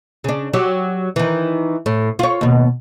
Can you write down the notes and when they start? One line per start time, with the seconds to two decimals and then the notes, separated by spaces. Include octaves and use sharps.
0.24 C#3 D4
0.54 F#3 G4
1.16 D#3 E3
1.86 A2
2.19 F4 C#5
2.41 D#2 B2